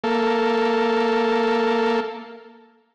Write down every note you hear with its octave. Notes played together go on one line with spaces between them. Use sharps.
A#3 A4